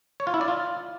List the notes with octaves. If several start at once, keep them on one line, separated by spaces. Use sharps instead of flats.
C#5
F4
E4
D5
F4